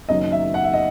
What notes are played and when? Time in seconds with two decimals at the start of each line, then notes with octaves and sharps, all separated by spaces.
0.09 F#1 F#2 D#3 F#3 C#4 D#5
0.32 E5
0.54 F#5
0.64 E5
0.73 D#5